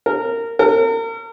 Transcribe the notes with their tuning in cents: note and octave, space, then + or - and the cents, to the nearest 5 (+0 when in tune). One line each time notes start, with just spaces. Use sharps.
A#4 -20
A#4 -40